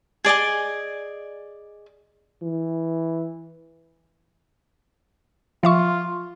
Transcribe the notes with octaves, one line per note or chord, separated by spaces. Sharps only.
G#4 D5 D#5 G#5
E3
F3 F4 E5 C#6